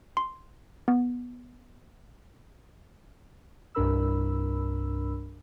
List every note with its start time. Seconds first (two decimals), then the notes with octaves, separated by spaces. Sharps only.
0.17 C6
0.88 B3
3.75 C2 G2 D4 A#4 B5 E6